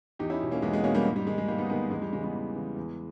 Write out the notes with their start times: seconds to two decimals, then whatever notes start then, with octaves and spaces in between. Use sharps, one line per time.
0.19 E2 D#4 G4
0.30 C#4 E4
0.41 B2
0.51 A#3 C#4
0.62 E2 G#3 B3
0.73 G#3 B3
0.84 B2 A#3 C#4
0.95 G3 A#3
1.05 G#2
1.16 G3
1.27 D#3 G#3
1.38 G#3
1.48 G#2 G3 A#3
1.58 B3 D#4
1.69 D#3 G#3 B3
1.90 E2 G#3
2.02 G3
2.12 C#3 E3 G#3
2.23 G#3 B3
2.34 E2
2.55 C#3 E3
2.76 E2